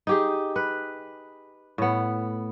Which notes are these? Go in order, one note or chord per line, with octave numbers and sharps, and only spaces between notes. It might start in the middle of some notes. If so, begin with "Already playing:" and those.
D#4 G4 G#4
B4
A2 B3